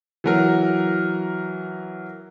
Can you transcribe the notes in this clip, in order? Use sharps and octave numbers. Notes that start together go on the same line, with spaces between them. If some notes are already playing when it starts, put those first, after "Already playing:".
E3 F#3 A#4